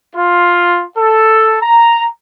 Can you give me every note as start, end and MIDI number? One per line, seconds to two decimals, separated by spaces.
0.16 0.84 65
0.98 1.56 69
1.62 2.06 82